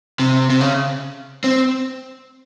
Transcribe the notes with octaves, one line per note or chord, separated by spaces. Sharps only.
C3
C3
C#3
C4